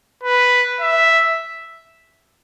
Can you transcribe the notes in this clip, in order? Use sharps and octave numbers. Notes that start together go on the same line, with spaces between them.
B4
E5